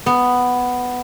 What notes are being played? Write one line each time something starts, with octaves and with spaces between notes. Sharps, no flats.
B3